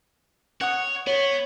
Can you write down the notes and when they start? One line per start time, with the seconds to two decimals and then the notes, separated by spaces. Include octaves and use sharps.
0.61 C#5 F#5 D#6
1.07 B3 C#5